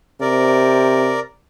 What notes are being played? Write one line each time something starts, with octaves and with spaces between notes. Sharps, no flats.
C3 A#4 D5